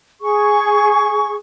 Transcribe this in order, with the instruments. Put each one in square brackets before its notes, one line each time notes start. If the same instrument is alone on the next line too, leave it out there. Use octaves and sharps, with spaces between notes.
[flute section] G#4 C#6